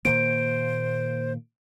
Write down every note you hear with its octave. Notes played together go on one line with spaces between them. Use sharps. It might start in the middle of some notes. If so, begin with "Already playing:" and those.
A#2 D#3 A#3 C5 D7